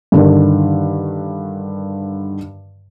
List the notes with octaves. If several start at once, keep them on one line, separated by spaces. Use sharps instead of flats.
G2 D3 D#3